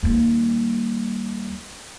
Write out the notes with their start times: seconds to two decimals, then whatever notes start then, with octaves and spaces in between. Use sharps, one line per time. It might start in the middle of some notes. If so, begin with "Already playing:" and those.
0.03 D#2 G3